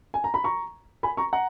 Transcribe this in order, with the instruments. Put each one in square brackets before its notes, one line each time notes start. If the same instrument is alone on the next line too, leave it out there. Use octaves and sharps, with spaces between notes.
[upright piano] G#5
A#5
B5
A#5 C#6
G#5 B5
A#5 C#6
F#5 A#5